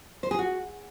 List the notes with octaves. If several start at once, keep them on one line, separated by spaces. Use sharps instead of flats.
C5
G#4
F#4